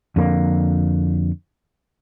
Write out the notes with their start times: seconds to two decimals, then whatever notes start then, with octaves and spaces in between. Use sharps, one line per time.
0.16 F2 D3 A#3